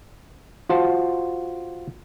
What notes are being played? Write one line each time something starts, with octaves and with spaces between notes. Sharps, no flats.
F4 F#4 C5 A5